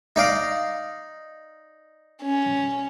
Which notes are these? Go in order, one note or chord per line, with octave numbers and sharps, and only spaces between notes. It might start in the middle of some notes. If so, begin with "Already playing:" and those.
D#4 D5 F5
C#4